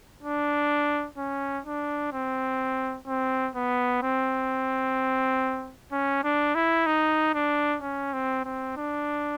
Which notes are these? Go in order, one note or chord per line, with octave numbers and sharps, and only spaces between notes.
D4
C#4
D4
C4
C4
B3
C4
C#4
D4
E4
D#4
D4
C#4
C4
C4
D4